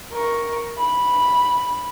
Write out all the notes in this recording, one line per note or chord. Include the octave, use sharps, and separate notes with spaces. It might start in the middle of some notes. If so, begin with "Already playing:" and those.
A#4 C#6
B5